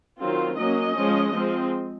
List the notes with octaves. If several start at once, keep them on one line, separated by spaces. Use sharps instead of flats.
D#3 F#3 C4 F4
F#3 A#3 C#4 D#5
F3 G#3 C#4
F3 G#3 C4